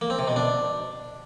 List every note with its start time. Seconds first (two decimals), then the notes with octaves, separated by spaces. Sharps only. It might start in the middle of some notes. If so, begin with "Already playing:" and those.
0.01 A#3
0.10 C4
0.19 C3
0.28 B2
0.36 D4